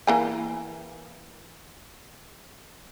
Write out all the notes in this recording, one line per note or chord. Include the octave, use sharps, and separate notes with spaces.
E3 A#3 G#5